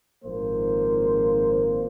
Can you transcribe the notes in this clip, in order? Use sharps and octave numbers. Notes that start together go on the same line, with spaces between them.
G#1 A#2 F3 A#3 C5